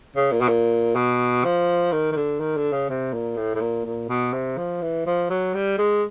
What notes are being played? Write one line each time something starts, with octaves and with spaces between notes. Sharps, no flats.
C#3
A#2
B2
A#2
B2
F3
D#3
D#3
D3
D#3
D3
C#3
C3
A#2
A2
A2
A#2
A#2
B2
C3
F3
E3
F3
F#3
G3
G#3